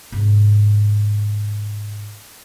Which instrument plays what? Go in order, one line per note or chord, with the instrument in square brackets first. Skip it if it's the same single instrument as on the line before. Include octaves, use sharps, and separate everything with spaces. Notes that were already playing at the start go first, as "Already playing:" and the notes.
[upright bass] G#2 C3